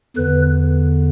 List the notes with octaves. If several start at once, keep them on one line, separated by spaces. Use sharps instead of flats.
E2 D3 B4